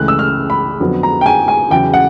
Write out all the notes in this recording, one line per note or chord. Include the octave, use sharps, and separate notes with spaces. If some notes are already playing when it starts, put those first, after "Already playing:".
Already playing: C#2 C#3 E3 A3 F#6
E6
F6
B5
F2 D3 F#3 B3
A#5
G5
G#5
G#5
E2 C#3 F#3 G5
F#5